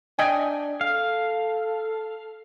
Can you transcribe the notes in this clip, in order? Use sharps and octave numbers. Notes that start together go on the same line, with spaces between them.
D4 D#5 G5 G#5
A4 F5